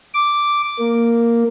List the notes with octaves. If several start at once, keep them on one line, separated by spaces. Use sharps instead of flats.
D6
A#3